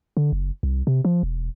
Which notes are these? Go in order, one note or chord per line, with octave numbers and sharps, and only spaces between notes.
D3
F#1
C2
C3
F3
E1